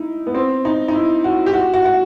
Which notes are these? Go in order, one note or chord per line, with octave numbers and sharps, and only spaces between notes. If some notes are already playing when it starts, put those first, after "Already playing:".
Already playing: D#4 E4
B3
C4
D#4
D#4
E4
F#4
G4
F#4
F#4
F#4